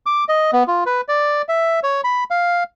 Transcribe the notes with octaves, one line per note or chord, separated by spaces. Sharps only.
D6
D#5
B3
F4
B4
D5
E5
C#5
B5
F5